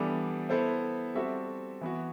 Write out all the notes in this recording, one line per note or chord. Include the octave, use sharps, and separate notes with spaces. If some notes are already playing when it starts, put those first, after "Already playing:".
Already playing: E3 G3 B3 D4 A4
B3 E4 A4 C5 E5
G3 C4 F#4 A4 E5
E3 B3 F#4